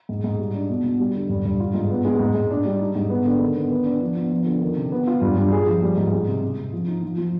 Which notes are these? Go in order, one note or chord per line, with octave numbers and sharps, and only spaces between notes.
G#2
G#2
G3
D4
B2
B2
G3
D3
G2
G2
F4
G#2
B3
G#3
G#2
G#2
D4
G3
D#4
G#2
B3
D3
D#3
B3
B4
D4
F3
B3
F3
D3
D#3
C3
B3
F4
G2
G2
G#4
F3
G3
G#2
G#3
C3
C3
C3
F3
D#4
F3
F3